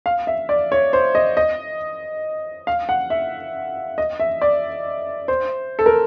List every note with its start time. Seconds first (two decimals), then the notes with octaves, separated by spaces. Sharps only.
0.06 F5
0.27 E5
0.49 D5
0.72 C#5
0.93 C5
1.15 D#5
1.37 D#5
2.67 F5
2.89 F#5
3.10 E5
3.98 D#5
4.20 E5
4.42 D5
5.28 C5
5.79 A4
5.86 A#4